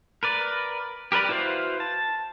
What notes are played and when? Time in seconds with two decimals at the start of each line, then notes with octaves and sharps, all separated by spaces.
0.23 A#4 B4 D5
1.12 G4 A#4 B4 D5 B5
1.29 E4 F#4 B4 C5 F5
1.80 A5